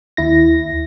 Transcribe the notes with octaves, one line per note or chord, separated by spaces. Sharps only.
D#2 E4 A#6